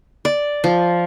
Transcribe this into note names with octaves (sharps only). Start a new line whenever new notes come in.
D5
F3